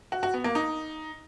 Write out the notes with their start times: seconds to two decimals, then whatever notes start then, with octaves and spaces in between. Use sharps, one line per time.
0.12 F#4
0.23 F#4
0.34 B3
0.44 A#3
0.55 D#4